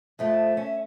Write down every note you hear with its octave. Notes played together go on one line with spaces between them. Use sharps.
F2 F3 A3 E5
C#4